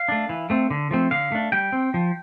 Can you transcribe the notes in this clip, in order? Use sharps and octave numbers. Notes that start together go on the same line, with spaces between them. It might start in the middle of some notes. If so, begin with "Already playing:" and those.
Already playing: F5
A3 D4
E3
A3 C4
D3
F3 A3 C4
D3 F5
A3 D4
G3 G5
C4
F3